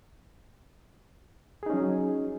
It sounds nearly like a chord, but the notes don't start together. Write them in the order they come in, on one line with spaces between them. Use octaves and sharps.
G#4 D#4 C#4 F#3